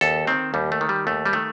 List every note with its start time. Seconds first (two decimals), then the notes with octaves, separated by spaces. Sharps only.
0.01 D#2 A4
0.27 D#3 C4
0.54 D#2 G3
0.72 A3
0.81 D#3
0.89 G3
1.07 D#2 A3
1.25 G3
1.33 D#3 A3